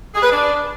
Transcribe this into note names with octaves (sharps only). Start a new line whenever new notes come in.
G#4
B4
D4